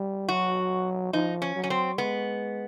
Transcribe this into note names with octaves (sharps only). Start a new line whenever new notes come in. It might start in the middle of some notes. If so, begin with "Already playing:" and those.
Already playing: G3
F#3 F#4
F3 D#4
C#4
F#3
C#4
C4
G#3 B3